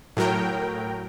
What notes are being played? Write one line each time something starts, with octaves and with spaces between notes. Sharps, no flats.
A2 F#3 A#4 G5